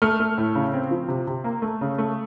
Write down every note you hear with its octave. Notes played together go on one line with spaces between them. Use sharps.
A3 F6
A3
A2
C#3
C4
F3
C3
C3
A#3
A3
C#3
A3